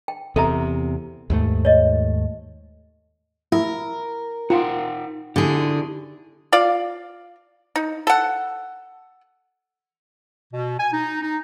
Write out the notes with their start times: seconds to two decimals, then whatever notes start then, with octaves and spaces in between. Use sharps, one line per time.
0.08 G5
0.36 E2 C3 A4 E5 A#5
1.30 D#2 G#2 A3
1.65 C#5 D#5
3.52 E4 A#4
4.50 D#4 F4 F#5 G5
5.36 D3 D#4 E4 G4 G#4
6.52 F4 D5 F5
7.76 D#4
8.07 A4 F#5
10.53 B2
10.78 G#5
10.92 D#4
11.22 D#4